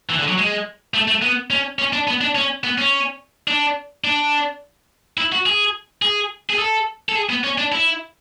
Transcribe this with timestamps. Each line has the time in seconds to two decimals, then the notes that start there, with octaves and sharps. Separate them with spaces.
0.10 E3
0.19 D3
0.28 F#3
0.38 G#3
0.94 A3
1.08 A3
1.22 B3
1.50 C#4
1.79 C#4
1.93 D4
2.08 B3
2.21 D4
2.35 C#4
2.64 B3
2.78 C#4
3.48 D4
4.04 D4
5.18 E4
5.32 F#4
5.46 G#4
6.02 G#4
6.50 G#4
6.59 A4
7.09 A4
7.15 G#4
7.29 B3
7.44 C#4
7.58 D4
7.72 E4